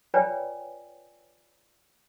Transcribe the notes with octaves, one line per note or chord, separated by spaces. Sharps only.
F4 B4 C#5 D5 G5 G#5